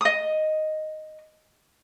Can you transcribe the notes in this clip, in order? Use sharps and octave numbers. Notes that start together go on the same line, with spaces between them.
D#5 D#6